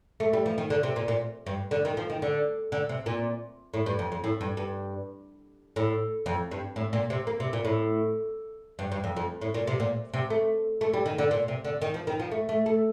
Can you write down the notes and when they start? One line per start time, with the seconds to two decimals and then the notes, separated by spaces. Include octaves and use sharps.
0.20 A3
0.33 G3
0.46 F3
0.58 D#3
0.70 D3
0.83 C3
0.96 A#2
1.08 A#2
1.47 G2
1.71 D3
1.85 D#3
1.97 F3
2.10 D#3
2.22 D3
2.72 D3
2.89 C3
3.06 A#2
3.74 A2
3.86 G2
3.99 F2
4.12 F2
4.24 A2
4.41 G2
4.57 G2
5.76 A2
6.26 F2
6.51 G2
6.76 A2
6.93 A#2
7.10 C3
7.27 A#3
7.40 C3
7.53 A#2
7.65 A2
8.79 G2
8.92 G2
9.04 F2
9.17 F2
9.41 A2
9.54 A#2
9.67 C3
9.80 A#2
10.14 C3
10.30 A3
10.81 A3
10.94 G3
11.06 D#3
11.18 D3
11.31 A#2
11.48 C3
11.65 D3
11.82 D#3
11.94 F3
12.07 D#3
12.19 F3
12.32 A3
12.49 A3
12.66 A3